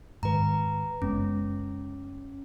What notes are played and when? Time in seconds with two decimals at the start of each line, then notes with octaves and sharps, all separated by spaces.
0.23 G#2 D#3 B4 A#5
1.02 F#1 G#3 B3 C#4